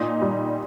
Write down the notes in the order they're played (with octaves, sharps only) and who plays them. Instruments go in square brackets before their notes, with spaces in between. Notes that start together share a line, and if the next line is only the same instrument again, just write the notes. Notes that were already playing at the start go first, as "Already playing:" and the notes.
Already playing: [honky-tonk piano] A#2 D#4
G3